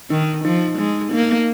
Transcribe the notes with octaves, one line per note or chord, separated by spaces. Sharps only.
D#3 D#4
F3 D#4
G#3 D#4
A#3 D#4